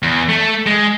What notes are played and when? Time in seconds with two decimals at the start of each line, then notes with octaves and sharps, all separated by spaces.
0.03 E2
0.29 A3
0.67 G#3